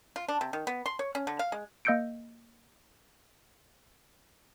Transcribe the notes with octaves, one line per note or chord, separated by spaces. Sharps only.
F4
D4
C3
D#3
B3
C6
C#5
C#4
D3
F5
G#3
A#3 D#5 E6 G6 C#7 D7